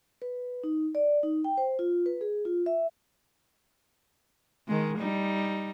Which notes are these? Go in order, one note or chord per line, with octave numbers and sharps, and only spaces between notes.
B4
D#4
D5
D#4
G5
C5
F4
B4
G#4
F4
E5
D#3 G#3
G3 D#4